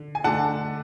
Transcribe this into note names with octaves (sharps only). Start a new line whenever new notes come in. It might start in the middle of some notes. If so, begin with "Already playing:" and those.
Already playing: D3
G#5
D3 A3 D4 F#5 A5